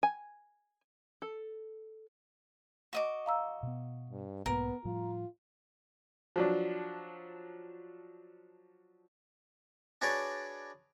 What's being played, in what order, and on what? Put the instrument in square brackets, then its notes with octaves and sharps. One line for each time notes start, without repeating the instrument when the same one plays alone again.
[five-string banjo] G#5
A4
[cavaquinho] F#4 D#5 D6
[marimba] F5 A#5 E6
[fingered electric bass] B2 B3
[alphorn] G2
[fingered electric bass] B1 G#2 A#3 [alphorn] B3 [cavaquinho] A#4
[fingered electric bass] A2 F3 G3 [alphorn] F4
[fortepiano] F3 F#3 D4
[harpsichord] D4 F#4 G#4 B4 C#5 D5